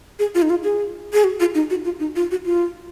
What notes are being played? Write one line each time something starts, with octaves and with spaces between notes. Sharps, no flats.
G#4
F4
D#4
F4
G#4
G#4
F#4
F4
D#4
F#4
F4
D#4
F4
F#4
F4